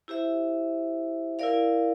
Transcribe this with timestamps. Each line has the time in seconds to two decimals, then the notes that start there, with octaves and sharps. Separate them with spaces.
0.08 E4 G4 C5 E5
1.39 E4 A#4 D5 F5